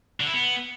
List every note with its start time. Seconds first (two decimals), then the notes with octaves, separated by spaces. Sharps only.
0.20 D3
0.27 E4
0.34 B3